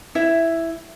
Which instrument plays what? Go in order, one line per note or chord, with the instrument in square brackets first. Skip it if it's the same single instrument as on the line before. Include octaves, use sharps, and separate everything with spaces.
[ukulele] E4 E5